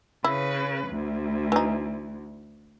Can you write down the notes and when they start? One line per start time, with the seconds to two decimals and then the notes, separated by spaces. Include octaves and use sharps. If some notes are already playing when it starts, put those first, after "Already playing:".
0.24 C#3 E4 B4
0.88 D2
1.52 E3 D#4